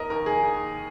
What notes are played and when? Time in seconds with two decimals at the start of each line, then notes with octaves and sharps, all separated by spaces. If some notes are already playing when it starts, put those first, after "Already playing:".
Already playing: D#2 A#4 D#5
0.10 D#2 A#4
0.26 G#4
0.43 D#2